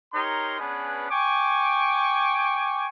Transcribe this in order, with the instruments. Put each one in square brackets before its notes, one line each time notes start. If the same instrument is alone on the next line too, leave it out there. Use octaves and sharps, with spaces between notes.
[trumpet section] D#4 G4 A#4 C#5 C6
B3 C#4 D4 G#4 B4
G5 G#5 C#6 D6